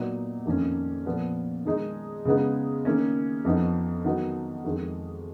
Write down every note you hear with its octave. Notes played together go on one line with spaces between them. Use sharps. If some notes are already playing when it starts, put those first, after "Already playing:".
Already playing: A#2 F#3 B3 D#4
F2 D#3 A#3 C#4
A#2 F3 B3
D#3 G#3 D#4
C#3 G#3 B3 D#4
D#3 A#3 C#4
F2 F3 B3 D#4
D#3 F#3 B3 D#4
F2 D#3 G#3